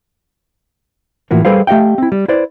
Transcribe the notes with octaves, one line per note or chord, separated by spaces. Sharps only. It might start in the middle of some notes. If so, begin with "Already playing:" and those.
A2 E3 F3 A#3 F#4
G3 G#4 A4 B4 C5 F5
A3 G4 D#5 F5 G5
C4 E4
G3
E4 B4 C5 D5